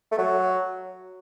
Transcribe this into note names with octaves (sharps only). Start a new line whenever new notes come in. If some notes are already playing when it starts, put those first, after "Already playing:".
A3
F#3